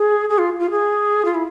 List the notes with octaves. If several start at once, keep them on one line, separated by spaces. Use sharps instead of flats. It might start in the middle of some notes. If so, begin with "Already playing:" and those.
Already playing: G#4
G#4
F4
F4
G#4
F4
E4